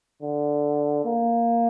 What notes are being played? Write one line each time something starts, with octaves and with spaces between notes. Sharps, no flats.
D3
A#3